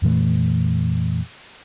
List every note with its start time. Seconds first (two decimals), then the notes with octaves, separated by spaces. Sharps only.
0.02 F2 A#2 E3 A3